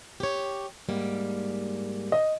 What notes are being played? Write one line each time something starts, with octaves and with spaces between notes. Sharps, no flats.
G4 C#5
G#2 G3 A#3
D#5